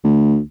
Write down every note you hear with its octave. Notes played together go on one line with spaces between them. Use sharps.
D2